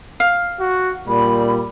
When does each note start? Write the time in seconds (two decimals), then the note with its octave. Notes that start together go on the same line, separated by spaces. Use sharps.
0.20 F5
0.60 F#4
1.08 A#2 G3 B5